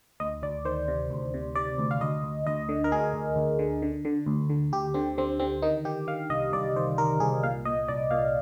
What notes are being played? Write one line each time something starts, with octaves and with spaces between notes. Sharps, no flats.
D2 D#5
D2 D5
D#3 C5
C3
D2
C3
C3 D5
D2
F5
D2 D#5
D2
D2 D#5
D3
A#4
D2 G#4
D2
D2
D3
D3
D3
D2
D3
D2 G4
D3 C4
D3 C4
D3 C4
D#3 D#4
D#3 G4
D#3 F5
C2 D#5
C2 D5
D#3 C5
D#3 A#4
C2 G#4
A#2 F5
A#2 D#5
C2 D5
A#2 F5